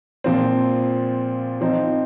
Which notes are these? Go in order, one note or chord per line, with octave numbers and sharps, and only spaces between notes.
A#2 F3 C4
F3 C4 D#4